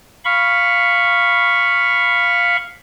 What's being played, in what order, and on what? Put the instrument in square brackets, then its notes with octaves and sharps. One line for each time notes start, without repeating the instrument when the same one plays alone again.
[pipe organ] F5 B5 C#6